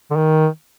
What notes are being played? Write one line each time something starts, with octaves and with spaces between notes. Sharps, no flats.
D3
D#3